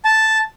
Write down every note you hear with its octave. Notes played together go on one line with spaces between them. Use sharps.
A5